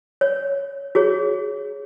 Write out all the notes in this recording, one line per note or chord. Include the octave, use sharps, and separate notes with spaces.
C#5
F#4 G#4 C#5